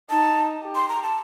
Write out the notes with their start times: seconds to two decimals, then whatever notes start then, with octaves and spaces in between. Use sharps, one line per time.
0.10 D#4 A5
0.64 G4
0.75 C6
0.89 A#5
1.03 A5